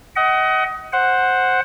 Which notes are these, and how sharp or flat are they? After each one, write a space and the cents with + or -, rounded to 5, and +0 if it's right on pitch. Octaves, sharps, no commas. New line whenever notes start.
D#5 +20 F#5 +30
C5 +5 F#5 +0